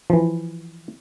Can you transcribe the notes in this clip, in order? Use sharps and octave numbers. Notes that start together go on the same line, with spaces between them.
E3 F3